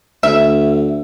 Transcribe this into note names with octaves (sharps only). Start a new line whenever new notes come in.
D2 E5